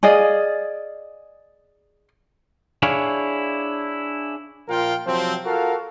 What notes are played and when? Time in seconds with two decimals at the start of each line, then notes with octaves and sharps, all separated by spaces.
0.03 G#4 D5 D#5 F5
2.83 D4 E4 G#4 C#5 F5
4.69 A#2 F3 F4 A#4 F5 G5
5.06 C3 F3 F#3 C4
5.44 F4 F#4 A4 A#4 F5